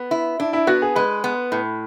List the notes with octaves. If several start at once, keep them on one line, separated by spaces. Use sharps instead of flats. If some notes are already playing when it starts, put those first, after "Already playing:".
Already playing: B3
E4
D4 E4
E4
B3 F#4
G#4
G#3 B4
B3
A2